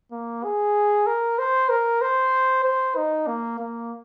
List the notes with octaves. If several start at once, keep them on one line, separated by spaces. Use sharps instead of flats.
A#3
G#4
A#4
C5
A#4
C5
C5
D#4
A#3
A#3